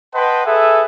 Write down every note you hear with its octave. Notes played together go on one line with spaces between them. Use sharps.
B4 D#5 F#5 G5 A5 C6
G#4 A4 B4 E5